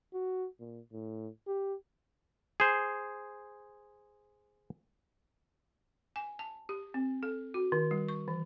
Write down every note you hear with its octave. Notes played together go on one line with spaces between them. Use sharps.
F#4
A#2
A2
G4
G#4 C5
G#5
A5
G4
C4
A4
F#4
D#3
G3
C#6
E3